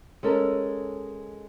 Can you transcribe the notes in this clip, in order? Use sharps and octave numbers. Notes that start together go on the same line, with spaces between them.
G#3 C#4 A4 A#4